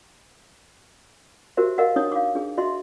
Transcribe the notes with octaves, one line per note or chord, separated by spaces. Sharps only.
F#4 G4 A#4 C5 E5
A#4 D#5 F5 F#5
D4 D#4 C#5 D#6
F5 D6
D4 G#4
F#4 D#5 E5 C6